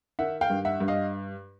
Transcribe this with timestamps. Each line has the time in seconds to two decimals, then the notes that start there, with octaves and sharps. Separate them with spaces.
0.19 D#3 E5 F#5
0.41 F5 G5
0.50 G2
0.65 E5 F#5
0.80 G2
0.88 D#5 F5